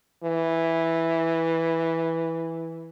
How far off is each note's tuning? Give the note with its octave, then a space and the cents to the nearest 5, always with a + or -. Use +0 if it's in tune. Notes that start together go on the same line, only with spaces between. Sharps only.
E3 -5